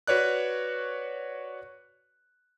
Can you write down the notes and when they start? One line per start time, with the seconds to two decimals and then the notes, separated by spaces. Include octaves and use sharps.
0.07 F#4 B4 C#5 D5 F#6